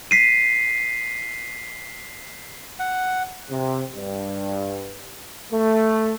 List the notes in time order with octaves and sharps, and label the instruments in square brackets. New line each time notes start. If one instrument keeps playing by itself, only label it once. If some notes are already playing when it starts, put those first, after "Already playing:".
[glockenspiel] B6 C7 D#7
[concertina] F#5
[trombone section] C3
G2
A3